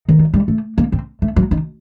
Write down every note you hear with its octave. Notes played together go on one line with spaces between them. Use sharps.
D#3
F#3
G3
A3
A#3
C4
A3
F#3
D#3